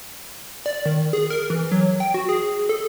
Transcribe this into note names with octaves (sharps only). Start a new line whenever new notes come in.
D5
D#3
G#4
A#4
E3
F#3
G5
F#4
G#4
A4